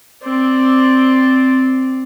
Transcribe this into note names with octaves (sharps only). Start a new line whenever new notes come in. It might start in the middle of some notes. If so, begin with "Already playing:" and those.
C4 D5